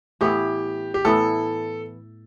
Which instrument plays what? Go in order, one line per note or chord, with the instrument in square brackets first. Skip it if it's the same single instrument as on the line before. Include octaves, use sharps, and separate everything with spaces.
[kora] A2 E3 B3 E4 [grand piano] G4
[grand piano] G4
[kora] A2 E3 B3 E4 [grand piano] A4